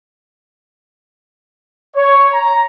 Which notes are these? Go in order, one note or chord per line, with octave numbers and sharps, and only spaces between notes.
C#5
A#5